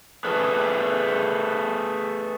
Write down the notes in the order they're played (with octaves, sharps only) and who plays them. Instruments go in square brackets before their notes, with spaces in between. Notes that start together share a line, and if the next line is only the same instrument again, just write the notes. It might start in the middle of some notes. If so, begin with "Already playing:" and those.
[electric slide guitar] A3 G#4 B4